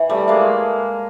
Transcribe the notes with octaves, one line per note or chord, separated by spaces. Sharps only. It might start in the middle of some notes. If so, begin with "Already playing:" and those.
Already playing: E3
G3 A3
G#3 A#3